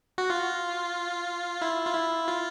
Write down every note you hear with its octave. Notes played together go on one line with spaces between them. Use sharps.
F#4
F4
E4
F4
E4
F4